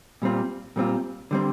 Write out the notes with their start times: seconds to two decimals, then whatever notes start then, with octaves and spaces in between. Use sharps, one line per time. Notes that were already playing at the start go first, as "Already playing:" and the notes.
0.22 A#2 G3 C4 F4
0.76 A#2 G3 C4 F4
1.31 D3 G3 C4